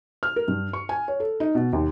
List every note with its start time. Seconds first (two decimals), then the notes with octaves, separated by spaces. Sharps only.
0.23 F6
0.36 A#4
0.48 G2
0.73 C#6
0.89 G#5
1.08 C#5
1.20 A4
1.40 D#4
1.55 B2
1.73 D#2